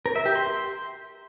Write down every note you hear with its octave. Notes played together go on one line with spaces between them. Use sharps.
A#4
E5
G4
C6